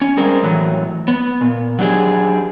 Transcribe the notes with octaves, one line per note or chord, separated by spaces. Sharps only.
C#4
G3 G#3 C4 A#4
A2 E3 F#3
B3
A#2
F#3 D4 G4 G#4